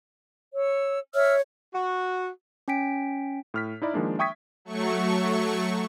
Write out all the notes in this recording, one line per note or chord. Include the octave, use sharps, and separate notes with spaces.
C#5 E6
C#5 E5 E6 F6
F#4
C#4 G5 G#5 B6 D7
A2 F6 B6
D#4 E4 D5 B5
D#3 F3 G#3 A#3 D4
E5 G5 C#6 D#6 G#6 B6
F#3 A3 C#6